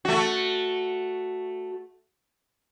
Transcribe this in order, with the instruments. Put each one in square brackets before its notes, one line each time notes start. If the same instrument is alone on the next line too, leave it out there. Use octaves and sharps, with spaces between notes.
[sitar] A3 F#4